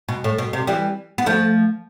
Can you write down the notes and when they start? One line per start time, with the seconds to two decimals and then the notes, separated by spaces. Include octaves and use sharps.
0.09 B2
0.24 A2
0.38 B2
0.53 C3
0.67 E3 G3
1.18 B3
1.26 F3 A3